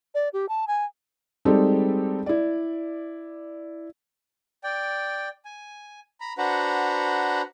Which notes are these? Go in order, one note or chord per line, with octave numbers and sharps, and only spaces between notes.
D5
G4
A5
G#5
G3 G#3 C4 D#4 G4 A4
E4 D5
D5 G5
G#5
A#5 B5
D4 F#4 B4 C5 F#5 A#5